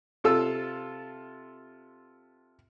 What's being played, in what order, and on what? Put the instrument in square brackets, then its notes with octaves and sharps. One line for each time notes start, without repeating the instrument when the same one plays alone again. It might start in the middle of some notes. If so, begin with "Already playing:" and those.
[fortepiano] C3 F4 A4 E6